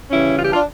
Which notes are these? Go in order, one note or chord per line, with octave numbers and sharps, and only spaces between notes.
C#3 E3 G3 C#4 E4
F4
G4
D4 F4